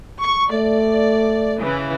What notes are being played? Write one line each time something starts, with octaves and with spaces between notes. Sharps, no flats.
C#6
A3 D5
C#3 E3